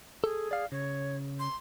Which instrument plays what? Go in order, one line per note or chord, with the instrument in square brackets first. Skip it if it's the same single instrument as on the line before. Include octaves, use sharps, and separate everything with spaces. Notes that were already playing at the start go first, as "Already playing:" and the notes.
[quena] G#4 [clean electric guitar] A4
[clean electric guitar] D5 F5
[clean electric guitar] C#3 [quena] C#5
[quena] C6